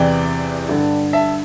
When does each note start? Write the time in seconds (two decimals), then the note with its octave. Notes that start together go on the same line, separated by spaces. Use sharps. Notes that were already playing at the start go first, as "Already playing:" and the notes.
Already playing: E2 C3 E3 D5 G5
0.69 G2 D3
1.13 E5 A5